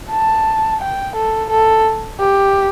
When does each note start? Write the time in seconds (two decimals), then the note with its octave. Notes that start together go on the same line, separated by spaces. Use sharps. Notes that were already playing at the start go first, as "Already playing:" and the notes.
0.10 A5
0.81 G5
1.16 A4
1.50 A4
2.20 G4